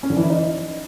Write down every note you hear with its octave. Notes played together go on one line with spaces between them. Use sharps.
C#4
D3
E3
E4
D#4